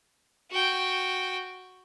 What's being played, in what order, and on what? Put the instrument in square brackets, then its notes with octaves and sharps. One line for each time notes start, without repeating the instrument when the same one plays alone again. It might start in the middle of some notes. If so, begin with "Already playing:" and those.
[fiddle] F#4 G5